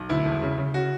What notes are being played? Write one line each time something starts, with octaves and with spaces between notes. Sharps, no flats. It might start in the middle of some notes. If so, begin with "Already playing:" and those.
Already playing: B1
D2 E4
E1
C#3
C#3
F#4